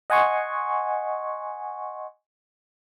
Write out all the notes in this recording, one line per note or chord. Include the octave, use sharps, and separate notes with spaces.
D#5 F#5 G#5 C6 C#6